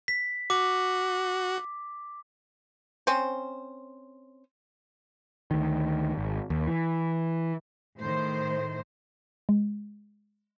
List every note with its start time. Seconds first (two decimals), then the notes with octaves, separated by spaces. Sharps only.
0.08 B6
0.50 F#4 D6 F#6
3.07 C4 C#4 C5
5.51 D2 D#3
6.17 G#1
6.50 D#2
6.67 E3
8.00 A2 D#3 C5
9.49 G#3